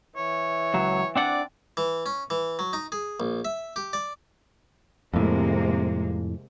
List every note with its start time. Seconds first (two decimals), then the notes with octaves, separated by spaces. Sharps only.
0.17 E3 C#5
0.74 C#2 F#3
1.16 C4 D4 D5 F#5
1.77 E3
2.06 C#4
2.30 E3
2.59 F#3
2.73 D#4
2.92 G#4
3.20 A#1
3.45 E5
3.76 G4
3.93 D5
5.14 F2 A2 C3 G#3 A#3